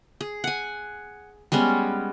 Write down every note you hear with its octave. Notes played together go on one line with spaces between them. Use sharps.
G#4
F#5 G#5
G3 G#3 B3 C#4